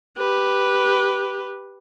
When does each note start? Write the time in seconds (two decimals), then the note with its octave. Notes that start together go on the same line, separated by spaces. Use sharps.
0.18 G4 B4